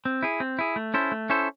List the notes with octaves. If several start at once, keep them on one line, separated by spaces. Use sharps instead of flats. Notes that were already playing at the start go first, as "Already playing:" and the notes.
C4
E4 G#4
C4
E4 G#4
A3
C#4 E4 A4 C5
A3
C#4 E4 A4 C5